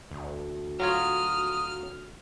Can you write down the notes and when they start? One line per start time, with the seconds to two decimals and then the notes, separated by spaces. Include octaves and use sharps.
0.11 D2
0.80 F#3 F4 C#5 D#6 F6